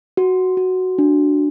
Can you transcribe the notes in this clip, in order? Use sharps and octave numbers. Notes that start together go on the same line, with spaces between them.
F#4
F#4
D4